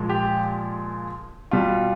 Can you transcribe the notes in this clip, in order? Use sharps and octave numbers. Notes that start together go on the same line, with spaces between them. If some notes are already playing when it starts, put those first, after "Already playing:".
Already playing: A#2 F3 G#3
G4
B2 G3 F4